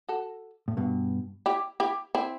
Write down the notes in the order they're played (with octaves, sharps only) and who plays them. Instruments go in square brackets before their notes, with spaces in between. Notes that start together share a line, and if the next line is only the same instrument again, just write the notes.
[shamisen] F#4 A4
[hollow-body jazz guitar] A2
G2 B2
[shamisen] E4 G4
E4 G4
C4 E4